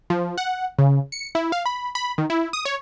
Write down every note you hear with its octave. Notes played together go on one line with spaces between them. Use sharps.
F3
F#5
C#3
C#7
E4
F5
B5
B5
D#3
E4
D#6
C#5